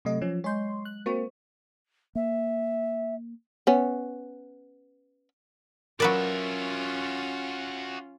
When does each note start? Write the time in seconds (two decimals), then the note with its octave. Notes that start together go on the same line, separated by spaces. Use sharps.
0.05 C3 F#3 A3 D#5
0.22 F3 C#4
0.44 G#3 C#5 D#5 C6 G6
0.85 F#6
1.06 A#3 C4 F#4 C5 C#6
2.15 A#3 E5
3.67 B3 C#4
6.00 F#3 C#4 F4 F#4 A#4 B4 D5 E5